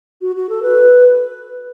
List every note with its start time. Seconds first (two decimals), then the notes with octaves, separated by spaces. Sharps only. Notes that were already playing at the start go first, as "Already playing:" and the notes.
0.21 F#4
0.36 F#4
0.49 A4
0.63 B4